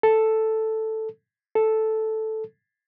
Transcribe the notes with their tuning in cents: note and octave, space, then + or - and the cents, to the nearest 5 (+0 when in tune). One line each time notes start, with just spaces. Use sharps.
A4 +0
A4 -5